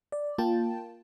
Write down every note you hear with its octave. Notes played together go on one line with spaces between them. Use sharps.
D5
A#3 F4 G5 A5